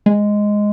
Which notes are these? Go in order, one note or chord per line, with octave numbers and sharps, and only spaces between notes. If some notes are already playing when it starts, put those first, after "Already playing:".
G#3